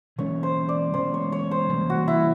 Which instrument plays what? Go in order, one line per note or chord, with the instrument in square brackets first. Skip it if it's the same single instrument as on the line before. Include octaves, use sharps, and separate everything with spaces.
[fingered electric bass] E3 G#3 C#4 [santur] C#5
[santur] C5
D5
[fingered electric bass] E3 G#3 C#4 [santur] C5
[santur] C#5
C#5
C5
[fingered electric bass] E3 G3 A#3 C#4
[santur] F#4
E4